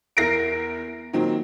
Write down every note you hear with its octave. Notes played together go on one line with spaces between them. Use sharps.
E2 E4 A#4 A#6 C7 D7
A#2 D#3 F#3 C4